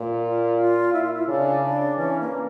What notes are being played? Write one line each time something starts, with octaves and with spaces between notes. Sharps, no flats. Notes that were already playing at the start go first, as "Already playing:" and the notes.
Already playing: A#2
F4
F4
E4
F4
E4
C#3 D4
D4
E3 C#4
A#3